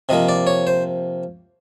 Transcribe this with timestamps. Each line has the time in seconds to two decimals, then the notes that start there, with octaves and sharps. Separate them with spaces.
0.09 C3 F3 A#3 D#5
0.29 D5
0.47 C#5
0.67 C5